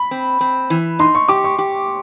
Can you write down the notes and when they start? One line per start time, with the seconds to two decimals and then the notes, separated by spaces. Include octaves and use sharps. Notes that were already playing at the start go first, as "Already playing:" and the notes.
Already playing: B5
0.11 C4
0.41 C4
0.70 E3
0.99 D#4 C6
1.15 C#6
1.28 G4 D6
1.44 C#6
1.59 G4